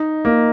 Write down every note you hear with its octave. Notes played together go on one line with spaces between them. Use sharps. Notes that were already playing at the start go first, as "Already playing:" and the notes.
Already playing: D#4
A#3